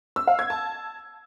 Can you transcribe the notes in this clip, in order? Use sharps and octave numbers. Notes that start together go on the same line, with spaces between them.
E6
F5
G#6
A5